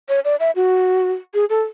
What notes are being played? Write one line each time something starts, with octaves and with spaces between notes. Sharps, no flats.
C#5
D5
E5
F#4
G#4
A4